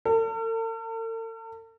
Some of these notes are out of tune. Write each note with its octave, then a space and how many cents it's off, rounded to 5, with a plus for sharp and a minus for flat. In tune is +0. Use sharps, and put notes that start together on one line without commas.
A4 +45